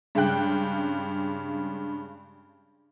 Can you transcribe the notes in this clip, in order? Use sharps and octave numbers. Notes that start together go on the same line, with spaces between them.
G2 C#3 G#3 G5 F#6